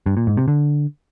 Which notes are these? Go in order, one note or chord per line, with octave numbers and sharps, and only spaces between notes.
G2
A#2
G#2
C3
D3